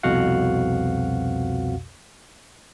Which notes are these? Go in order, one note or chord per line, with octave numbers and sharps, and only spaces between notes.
C2 F2 B2 F#4 F5 F#5